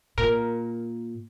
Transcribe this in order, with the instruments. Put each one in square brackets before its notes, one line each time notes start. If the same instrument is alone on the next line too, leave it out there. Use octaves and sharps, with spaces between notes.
[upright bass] A#2 [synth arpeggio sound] A#4